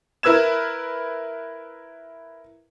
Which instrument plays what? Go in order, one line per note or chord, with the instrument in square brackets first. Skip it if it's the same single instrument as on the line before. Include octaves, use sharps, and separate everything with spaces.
[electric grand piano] E4 A#4 B4 E6 G#6 E7